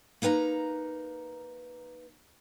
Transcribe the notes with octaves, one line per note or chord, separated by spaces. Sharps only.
A#3 D#4 B4 G#5 A#5